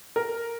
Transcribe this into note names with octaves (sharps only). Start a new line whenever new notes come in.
A#4